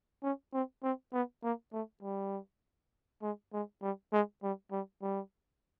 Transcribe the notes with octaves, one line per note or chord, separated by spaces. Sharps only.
C#4
C4
C4
B3
A#3
A3
G3
G#3
G#3
G3
G#3
G3
G3
G3